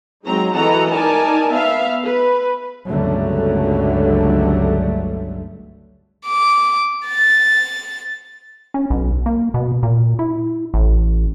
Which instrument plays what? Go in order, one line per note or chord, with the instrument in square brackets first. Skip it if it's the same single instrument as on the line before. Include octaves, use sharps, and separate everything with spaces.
[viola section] F#3 G#3 C4 D#4 G#4 A#5
E3 F#4 A4 D#5 F#5 A#5
D#4 A#4 D5 G#5 A5
B3 E5 F5
B4
[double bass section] G1 C#2 D3 F#3 G3 A3
[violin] D6
A6
[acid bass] C#4
B1
A#3
B2
A#2
E4
A1